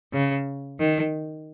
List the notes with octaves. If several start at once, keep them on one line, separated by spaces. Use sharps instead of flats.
C#3
D#3